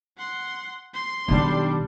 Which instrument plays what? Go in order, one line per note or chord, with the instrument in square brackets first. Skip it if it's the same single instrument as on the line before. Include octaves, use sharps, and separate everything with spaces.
[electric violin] F#5 C6
C6
[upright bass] B1 D#3 [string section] G3 D4